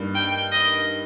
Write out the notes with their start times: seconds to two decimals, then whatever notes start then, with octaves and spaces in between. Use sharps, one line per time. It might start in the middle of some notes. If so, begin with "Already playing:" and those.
Already playing: G2 G3 A#3 D#4
0.15 G5
0.52 D#5